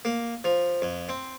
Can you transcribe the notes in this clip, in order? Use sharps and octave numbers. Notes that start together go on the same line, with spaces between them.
A#3
F3
F2
C4